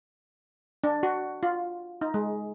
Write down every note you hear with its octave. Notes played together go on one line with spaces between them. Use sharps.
D4
F#4
F4
D#4
G#3